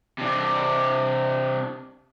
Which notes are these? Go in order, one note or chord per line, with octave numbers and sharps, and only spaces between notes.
C3 D4